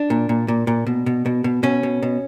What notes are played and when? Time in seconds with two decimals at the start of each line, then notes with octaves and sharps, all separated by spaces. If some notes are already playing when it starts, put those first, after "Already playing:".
Already playing: D4
0.10 A#2
0.29 A#2
0.48 A#2
0.67 A#2
0.87 B2
1.06 B2
1.26 B2
1.44 B2
1.63 B2 C#4
1.83 B2
2.03 B2